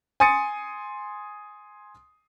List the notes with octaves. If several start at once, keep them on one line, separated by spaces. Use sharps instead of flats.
G#5 C6 D#6 A6 C#7 D#7